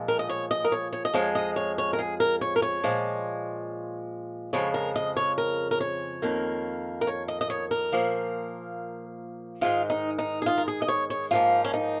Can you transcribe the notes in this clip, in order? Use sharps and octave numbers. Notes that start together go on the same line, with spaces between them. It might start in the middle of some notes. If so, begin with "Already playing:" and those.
Already playing: A#2 F3 G#3
A#4
D#5
C#5
D#5
A#4
C#5
C#5
D#5
F2 F3 G#3 C#5
D#5
C#5
C#5
A#4
G#4
A#4
C#5
A#4
C#5
A#2 F3 G#3
F2 C#3 F3 G#3 C#5
A#4
D#5
C#5
A#4
A#4
C#5
F2 D#3 A#3
A#4
C#5
D#5
D#5
C#5
A#4
A#2 F3 A#3
G#2 D#3 G#3 F4
D#4
D#4
G#4
F4
A#4
G#4
D#5
C#5
C#5
G#2 F3 A#3 F4
C#4
D#4